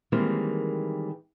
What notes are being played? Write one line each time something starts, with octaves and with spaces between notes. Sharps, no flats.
D#3 E3 G3 G#3 A#3 C4